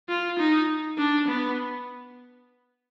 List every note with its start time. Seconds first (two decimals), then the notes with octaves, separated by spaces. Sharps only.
0.09 F4
0.39 D#4
0.98 D4
1.28 B3